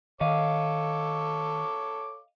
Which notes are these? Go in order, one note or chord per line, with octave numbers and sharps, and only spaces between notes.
D#3 A4 C#5 D#5 F5 D6